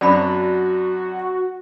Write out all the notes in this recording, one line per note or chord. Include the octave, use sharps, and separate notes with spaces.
F#2 C4 D4 F#4 D5 B5